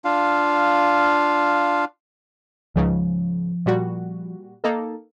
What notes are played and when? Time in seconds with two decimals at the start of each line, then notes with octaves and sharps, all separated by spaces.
0.05 D4 F4 F5
2.76 C#2 G#2 C#3 F3
3.66 A#2 G3 F#4
4.64 A#3 D#4 A4